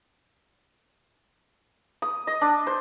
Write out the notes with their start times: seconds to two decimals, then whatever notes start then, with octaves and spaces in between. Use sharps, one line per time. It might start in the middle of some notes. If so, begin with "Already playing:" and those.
2.02 D#6
2.27 D#5
2.41 D4
2.67 C5